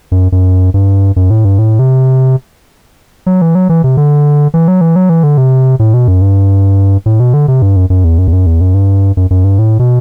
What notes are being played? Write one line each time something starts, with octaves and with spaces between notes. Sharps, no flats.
F#2
F#2
G2
F#2
A2
G2
A2
C3
F#3
E3
F#3
E3
C3
D3
E3
F#3
E3
F#3
E3
D3
C3
A2
B2
F#2
G2
A2
B2
D3
C3
G2
F#2
F#2
E2
F#2
E2
F#2
E2
F#2
G2
F#2
F#2
G2
A2
B2